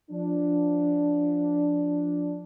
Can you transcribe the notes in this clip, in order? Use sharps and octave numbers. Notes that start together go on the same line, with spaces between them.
F3 D4